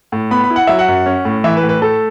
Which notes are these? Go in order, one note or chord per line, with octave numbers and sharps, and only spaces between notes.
A2
B3 B5
B5
E4
F#5
F#3 E5
F#5
F#2
C#4
A2
E3 E5
B4
A2
B4
A3 A4